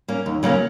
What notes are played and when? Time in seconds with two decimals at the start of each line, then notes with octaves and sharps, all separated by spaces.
0.08 A#3 C#4
0.26 D#2
0.43 C#3 F#3 A#3 C#4